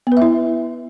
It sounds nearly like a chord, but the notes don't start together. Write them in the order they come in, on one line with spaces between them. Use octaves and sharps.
B3 B4 E5 E4